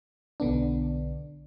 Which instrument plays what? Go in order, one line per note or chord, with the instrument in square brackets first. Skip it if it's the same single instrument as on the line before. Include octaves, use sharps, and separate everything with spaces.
[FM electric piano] B1 D3 B3 D4